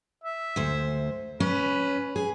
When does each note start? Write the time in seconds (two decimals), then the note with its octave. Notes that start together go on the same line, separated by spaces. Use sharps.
0.24 E5
0.56 D2 C5
1.40 C#4 B4
2.16 G#4